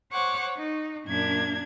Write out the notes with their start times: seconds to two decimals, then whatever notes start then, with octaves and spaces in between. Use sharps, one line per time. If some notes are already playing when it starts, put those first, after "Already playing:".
0.12 C5 C#5 F#5 C#6 D6
0.57 D#4
1.06 F#2 A#2 D4 A#4 G#6